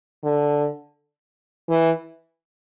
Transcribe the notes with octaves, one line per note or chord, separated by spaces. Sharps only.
D3
E3